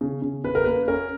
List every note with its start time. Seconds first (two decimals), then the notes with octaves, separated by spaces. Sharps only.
0.01 C#3
0.22 C#3
0.44 C#3 B4
0.55 A#4
0.64 A#3 B4
0.88 C#4 A#4